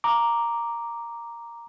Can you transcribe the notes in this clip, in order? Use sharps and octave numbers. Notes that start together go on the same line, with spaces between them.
A#5 D6